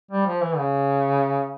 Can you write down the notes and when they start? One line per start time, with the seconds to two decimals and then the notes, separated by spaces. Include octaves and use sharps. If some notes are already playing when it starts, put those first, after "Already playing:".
0.11 G3
0.26 F3
0.42 E3
0.58 C#3